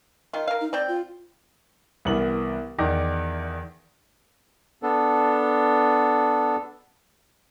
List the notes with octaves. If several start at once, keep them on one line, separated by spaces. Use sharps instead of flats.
D#3 F4
A#4 F5
D#4
C4 D5 G5
F4
C2 E3 B3 A#4 F#7
E2 D#3 D5 D6 A#6
B3 D4 A4